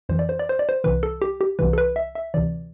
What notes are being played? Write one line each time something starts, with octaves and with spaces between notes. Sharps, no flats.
F2 E3 C5
D5
C5
D5
C5
D5
C5
C2 C3 E3 B4
A4
G4
G4
C2 C3 E3 B4
A4
B4
E5
E5
D2 C3 E3 D5